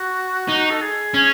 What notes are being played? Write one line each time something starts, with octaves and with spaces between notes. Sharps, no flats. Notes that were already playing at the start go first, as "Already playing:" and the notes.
Already playing: F#4
D#4
A4
G#4
C#4